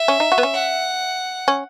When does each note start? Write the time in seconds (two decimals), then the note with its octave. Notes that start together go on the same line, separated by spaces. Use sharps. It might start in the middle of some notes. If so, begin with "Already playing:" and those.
Already playing: E5
0.08 C#4
0.20 D#4
0.32 F#4
0.38 B3
0.43 C#4
0.54 F#5
1.48 C#4